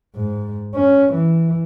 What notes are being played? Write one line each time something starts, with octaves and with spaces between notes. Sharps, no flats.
G#2
C#4
E3